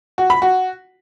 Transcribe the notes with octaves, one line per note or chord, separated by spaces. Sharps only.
F#4
B5
F#4